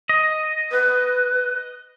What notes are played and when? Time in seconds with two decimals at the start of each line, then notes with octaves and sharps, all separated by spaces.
0.09 D#5
0.72 B4